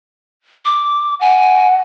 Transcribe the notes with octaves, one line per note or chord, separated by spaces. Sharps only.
D6
F#5 G#5